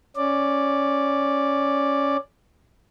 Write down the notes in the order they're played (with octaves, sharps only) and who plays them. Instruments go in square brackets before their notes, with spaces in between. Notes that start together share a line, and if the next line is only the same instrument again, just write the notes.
[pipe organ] C#4 D5